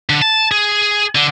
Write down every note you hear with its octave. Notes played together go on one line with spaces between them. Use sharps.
D3
A5
G#4
D3